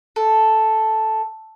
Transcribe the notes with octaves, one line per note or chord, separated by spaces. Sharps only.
A4